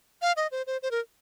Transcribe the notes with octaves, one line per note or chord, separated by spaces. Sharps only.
F5
D#5
C5
C5
C5
A#4